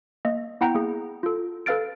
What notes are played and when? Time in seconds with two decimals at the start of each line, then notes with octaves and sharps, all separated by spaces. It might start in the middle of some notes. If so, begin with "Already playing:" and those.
0.25 A#3 D#5
0.61 B3 E4 F#5 G5 A#5 G6
0.75 A#3 G#4
1.23 F4 A4
1.66 A4 B4 F5 F6 A6 D7